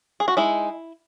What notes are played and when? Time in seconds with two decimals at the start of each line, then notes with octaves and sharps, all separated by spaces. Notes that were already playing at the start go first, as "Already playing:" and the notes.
0.20 G#4
0.28 F#4
0.37 G#3 D#4 E4